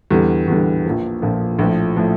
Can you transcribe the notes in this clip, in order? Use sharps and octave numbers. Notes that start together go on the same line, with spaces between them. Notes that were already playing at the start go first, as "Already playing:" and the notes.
E2 D3 G3
E2 D3 G3
A#1 A#2 F3
A#1 A#2 F3
A#1 A2 F3
A2 F3